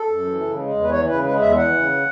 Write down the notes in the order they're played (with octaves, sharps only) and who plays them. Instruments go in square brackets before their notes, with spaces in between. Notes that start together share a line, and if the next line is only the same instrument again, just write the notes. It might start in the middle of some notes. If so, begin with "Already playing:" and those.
Already playing: [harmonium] A4
F#2
E3
C#3
G#3
E2
B4
E3 C#5
C#3 B4
G#3 B4
E2 E5
E3 F#5
C#3